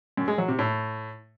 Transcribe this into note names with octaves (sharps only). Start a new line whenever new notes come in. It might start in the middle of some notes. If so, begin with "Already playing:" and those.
F#2
G#3
F#3
C3
A2